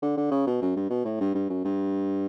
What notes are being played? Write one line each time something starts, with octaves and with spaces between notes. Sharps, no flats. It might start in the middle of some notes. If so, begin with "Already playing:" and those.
D3
D3
C#3
B2
F#2
G2
B2
A2
G2
G2
F#2
G2